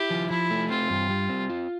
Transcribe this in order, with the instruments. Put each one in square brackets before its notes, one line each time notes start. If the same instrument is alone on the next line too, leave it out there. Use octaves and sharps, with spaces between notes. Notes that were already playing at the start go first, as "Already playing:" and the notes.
Already playing: [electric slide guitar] E4 [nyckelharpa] G4
[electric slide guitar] F3
[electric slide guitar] F3 [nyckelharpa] E4
[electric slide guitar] A3
[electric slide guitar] C4 [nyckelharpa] F4
[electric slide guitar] G2
G3
C4
F4